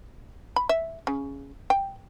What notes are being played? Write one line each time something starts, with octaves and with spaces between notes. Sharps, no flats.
B5
E5
C#3
G5